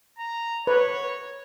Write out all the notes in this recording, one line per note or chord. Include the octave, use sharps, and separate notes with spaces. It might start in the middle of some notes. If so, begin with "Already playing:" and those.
A#5
B4 C#5